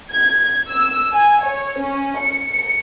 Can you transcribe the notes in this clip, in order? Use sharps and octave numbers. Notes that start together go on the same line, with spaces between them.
G#6
E6
G#5
C#5
C#4
C#7
C#7